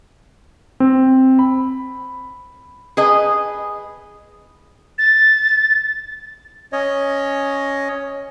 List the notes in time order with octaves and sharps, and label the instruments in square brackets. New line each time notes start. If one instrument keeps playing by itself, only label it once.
[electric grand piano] C4
B5
[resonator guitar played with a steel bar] G#4 B4 D#5
[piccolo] A6
[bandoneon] C#4 C#5 D#5